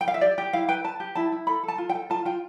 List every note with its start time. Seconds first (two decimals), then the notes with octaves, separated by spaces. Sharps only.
0.01 G5
0.08 F5
0.14 E5
0.21 G4 D5
0.38 G4
0.53 E4 F5
0.69 B4 G5
0.84 B4 A5
1.00 G4
1.15 E4 A5
1.32 E4
1.47 A4 B5
1.63 A4
1.68 A5
1.78 F4
1.89 G5
1.95 A4
2.10 F4 A5
2.25 F4 G5